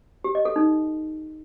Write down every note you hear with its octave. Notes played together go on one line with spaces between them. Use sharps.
G4
D#5
A4
D#4